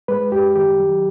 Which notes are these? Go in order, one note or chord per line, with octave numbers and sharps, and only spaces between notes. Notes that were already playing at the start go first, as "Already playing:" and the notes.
G#3 B4
F#2 G4
D#3 G4
F#3